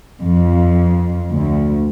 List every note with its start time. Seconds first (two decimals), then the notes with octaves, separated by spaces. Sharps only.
0.22 F2
1.33 D2